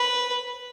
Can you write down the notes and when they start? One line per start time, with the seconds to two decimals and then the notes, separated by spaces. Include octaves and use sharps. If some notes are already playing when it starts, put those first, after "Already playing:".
Already playing: B4